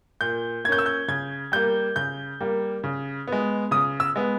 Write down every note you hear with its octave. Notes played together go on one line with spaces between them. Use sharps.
A#2 G6
A#3 C#4 G6 G#6
E6
G6
C#3 G#6
G3 A#3 G6
C#3 G6
G3 A#3
C#3
G#3 B3
C#3 D#6
E6
G#3 B3